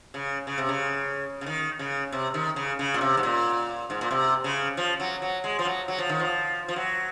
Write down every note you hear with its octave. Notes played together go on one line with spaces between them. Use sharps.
C#3
C#3
C3
C#3
C#3
D#3
C#3
C3
D#3
C#3
C#3
A#2
C3
G#2
A#2
G#2
A#2
C3
C#3
F3
F#3
F#3
G#3
F3
F#3
F#3
F3
D#3
F3
F3
F#3